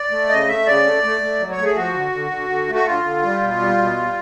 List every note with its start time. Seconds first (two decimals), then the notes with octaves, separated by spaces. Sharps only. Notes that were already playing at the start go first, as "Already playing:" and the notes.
Already playing: D5
0.11 A3
0.29 C#3 D#5
0.48 A3 E5
0.67 C#3 D5
0.85 A3
1.04 A3
1.21 A3
1.40 F#3
1.52 C#5
1.58 A3
1.64 G#4
1.76 F3 F#4
1.94 D3
2.12 D3
2.31 D3
2.49 D3
2.68 A3
2.75 F#4
2.86 D3 F4
3.04 D3
3.23 G3
3.41 B2
3.59 G3
3.78 B2
3.96 G3